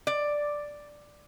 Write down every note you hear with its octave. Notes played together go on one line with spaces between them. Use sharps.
D5